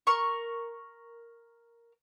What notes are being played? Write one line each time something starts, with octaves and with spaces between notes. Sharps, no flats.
A#4 C#6